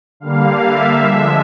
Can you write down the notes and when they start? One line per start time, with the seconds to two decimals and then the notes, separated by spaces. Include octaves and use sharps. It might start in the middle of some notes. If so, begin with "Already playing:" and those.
0.20 D3 G3 A#3 F5
0.63 E5
1.06 D3 F3 G#3